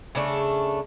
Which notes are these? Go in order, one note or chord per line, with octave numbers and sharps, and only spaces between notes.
C#3 A3 D4